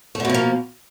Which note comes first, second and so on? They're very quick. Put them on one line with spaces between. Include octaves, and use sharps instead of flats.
A3 D3 B2 F3 A#3